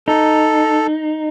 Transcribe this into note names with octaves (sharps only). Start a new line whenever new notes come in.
D#4 A4